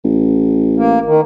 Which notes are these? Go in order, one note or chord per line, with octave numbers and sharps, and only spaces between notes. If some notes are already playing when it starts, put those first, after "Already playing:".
A1
A#3
D#3